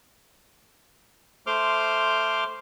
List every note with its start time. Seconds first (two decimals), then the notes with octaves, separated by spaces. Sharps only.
1.47 A3 C5 C6 D6 F6